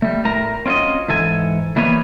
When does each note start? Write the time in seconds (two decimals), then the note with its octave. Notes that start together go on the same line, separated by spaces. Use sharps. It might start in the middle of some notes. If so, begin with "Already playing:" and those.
0.02 G3 A3
0.25 A2 A3 A#4 A#5
0.66 C4 C#4 F4 F#4 D#5
1.08 G#2 E3 A4 G#5
1.76 E3 G3 A#3 B3 B4 C#5